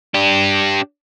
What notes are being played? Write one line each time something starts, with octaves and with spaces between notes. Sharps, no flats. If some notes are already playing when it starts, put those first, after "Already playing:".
D4 G4